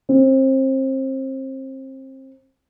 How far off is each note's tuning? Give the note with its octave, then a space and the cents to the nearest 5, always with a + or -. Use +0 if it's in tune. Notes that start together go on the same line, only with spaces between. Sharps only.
C4 +30